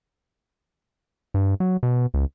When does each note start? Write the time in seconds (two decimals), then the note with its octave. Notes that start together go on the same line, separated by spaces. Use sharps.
1.34 G2
1.60 F#3
1.83 B2
2.14 C#2